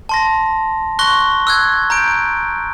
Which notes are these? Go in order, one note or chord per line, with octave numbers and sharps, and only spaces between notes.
A5 C6 A#6
C6 C#6 F#6 A#6 G7
E6 F#6 G#6
A#5 G6 D7